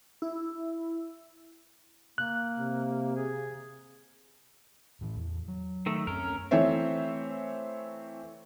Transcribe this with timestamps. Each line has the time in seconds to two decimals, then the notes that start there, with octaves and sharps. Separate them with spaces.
0.22 E4
2.18 A#3 F#6
2.58 C3
3.16 G#4
5.01 A2 E3
5.16 E2
5.48 F#3
5.86 D#3 A3
6.07 F#2 C4 C#4 A#4
6.51 E3 A3 C4 C5 C#5 E5